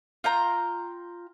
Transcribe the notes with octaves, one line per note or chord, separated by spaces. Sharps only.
F4 G5 A#5